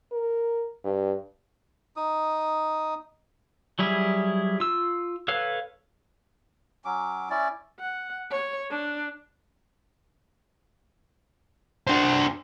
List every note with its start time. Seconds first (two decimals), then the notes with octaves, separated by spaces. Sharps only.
0.12 A#4
0.85 G2
1.97 D#4 D#6
3.79 F#3 G3 E4 G#4
4.60 F4 E6
5.28 A4 B4 C#5 F5
6.85 F#3 C#4 D6
7.30 C#4 E4 D5
7.79 F#5
8.30 C#5
8.70 D4
11.87 D4 C5